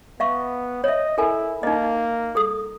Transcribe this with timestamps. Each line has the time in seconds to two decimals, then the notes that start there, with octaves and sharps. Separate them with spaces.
0.20 B3 E5 F5 C#6
0.84 C#5 D#5 E5
1.18 E4 A4 A#4 G#5
1.63 A#3 D#4 D#5
2.35 G#4 A4 D#6